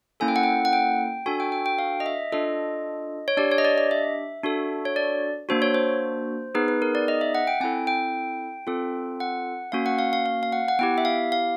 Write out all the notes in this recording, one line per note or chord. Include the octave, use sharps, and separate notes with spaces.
A#3 C#4 E4 A4 G#5
G5
F#5
G5
F#5
G5
D4 F#4 A4 G#5
G5
G5
G5
F5
D#5
E5
D4 F4 A4 D#5
C#5
D4 G4 D5
C#5
D#5
D5
D#5
E5
D4 F#4 A4
C#5
D5
A#3 D4 F#4 C5
C#5
C5
B3 D#4 G#4 B4
B4
A#4
D5
D#5
E5
F#5
G5
C4 E4 A4 G#5
G5
C4 F4 A4
F#5
A#3 C#4 F#4 F5
F#5
F5
F5
F5
F5
F#5
F#5
B3 E4 G4 G5
E5
F5
F5